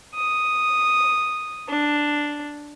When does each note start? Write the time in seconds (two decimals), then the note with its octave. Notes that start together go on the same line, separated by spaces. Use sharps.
0.15 D#6
1.68 D4